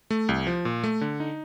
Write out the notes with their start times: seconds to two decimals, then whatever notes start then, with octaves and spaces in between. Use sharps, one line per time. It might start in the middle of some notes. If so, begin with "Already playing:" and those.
0.11 A3
0.29 C2
0.47 F3
0.65 A#2
0.84 A3
1.01 D3
1.20 D#4